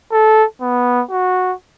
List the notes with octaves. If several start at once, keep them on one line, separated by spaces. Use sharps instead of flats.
A4
B3
F#4